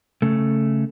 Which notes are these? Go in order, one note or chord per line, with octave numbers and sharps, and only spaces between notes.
C#3 A3